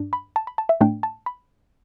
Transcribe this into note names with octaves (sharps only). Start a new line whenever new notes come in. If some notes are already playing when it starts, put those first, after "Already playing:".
Already playing: G2 D4
B5
A5
B5
A5
E5
A2 A3 D4 G5
A5
B5